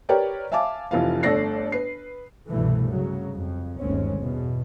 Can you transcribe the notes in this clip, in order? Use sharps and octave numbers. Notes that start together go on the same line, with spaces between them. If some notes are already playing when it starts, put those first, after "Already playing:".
G4 A#4 B4 C#5 D5 G5
E5 F5 G#5 A5 D6
F1 E3 F4 F5
G1 A3 A4 D5 A#6 C7
B4 C7
C2 G2 B2 E3 A3
C#3 F#3
F2
G1 D#2 G#3 C4 C#4
E2 B2